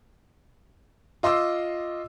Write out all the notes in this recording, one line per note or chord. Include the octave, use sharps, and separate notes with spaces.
F4 D#5 C6 D6 E6